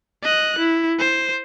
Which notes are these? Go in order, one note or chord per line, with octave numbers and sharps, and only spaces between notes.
D#5 F#6
E4
C5